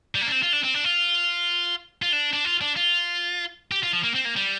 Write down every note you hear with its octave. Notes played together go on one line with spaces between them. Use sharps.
G3
A#3
D4
C4
F4
D4
C4
D4
F4
F4
D4
D4
F4
D4
F4
G4
F4
F3
A#3
C4
A#3
G3